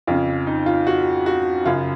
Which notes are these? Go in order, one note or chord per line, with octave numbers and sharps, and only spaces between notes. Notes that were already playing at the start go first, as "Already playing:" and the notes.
F2 C#3 F4
D#4
F4
F#4
F#4
F#2 C#3 F4